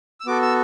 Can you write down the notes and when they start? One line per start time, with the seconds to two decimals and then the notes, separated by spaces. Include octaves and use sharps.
0.20 E6
0.26 B3 F#4 A4 D6
0.42 E6